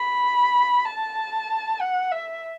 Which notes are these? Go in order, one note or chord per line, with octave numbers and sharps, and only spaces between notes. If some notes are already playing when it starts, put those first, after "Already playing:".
Already playing: B5
A5
F#5
E5